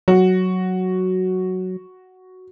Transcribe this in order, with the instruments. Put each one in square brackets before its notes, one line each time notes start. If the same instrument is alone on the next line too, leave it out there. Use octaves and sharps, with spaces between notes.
[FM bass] F#3 [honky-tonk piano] F#4